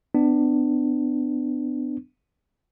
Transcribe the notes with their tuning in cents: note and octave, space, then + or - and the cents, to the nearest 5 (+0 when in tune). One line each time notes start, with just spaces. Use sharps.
B3 +35 D4 +20